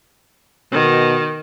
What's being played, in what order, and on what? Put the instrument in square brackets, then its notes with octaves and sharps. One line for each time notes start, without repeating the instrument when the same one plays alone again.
[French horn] B2 [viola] D#3